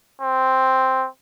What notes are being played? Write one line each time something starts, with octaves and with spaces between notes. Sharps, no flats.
C4